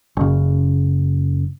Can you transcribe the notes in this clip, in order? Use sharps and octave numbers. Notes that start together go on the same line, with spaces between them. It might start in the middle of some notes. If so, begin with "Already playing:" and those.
F#1 C#3